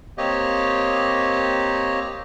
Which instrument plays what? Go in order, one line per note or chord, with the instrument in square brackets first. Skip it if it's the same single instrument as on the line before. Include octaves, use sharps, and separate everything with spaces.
[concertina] A#3 C4 G4 C#5 D#5